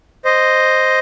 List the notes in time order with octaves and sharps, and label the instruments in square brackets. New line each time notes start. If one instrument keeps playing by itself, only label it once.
[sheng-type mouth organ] C5 D#5